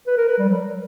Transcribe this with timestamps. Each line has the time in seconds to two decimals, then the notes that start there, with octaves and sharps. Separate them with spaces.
0.07 B4
0.17 A#4
0.28 B4
0.38 G3
0.49 F#3